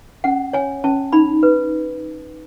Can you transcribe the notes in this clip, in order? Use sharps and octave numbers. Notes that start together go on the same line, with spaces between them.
C#4 F#5
C#5 G#5
C#4 A5
D#4 B5
B4